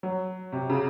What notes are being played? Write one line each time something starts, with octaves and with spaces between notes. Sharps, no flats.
F#3
C3
C#3